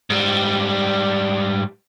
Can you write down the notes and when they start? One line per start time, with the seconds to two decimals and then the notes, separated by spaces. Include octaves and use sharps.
0.10 G#2 G3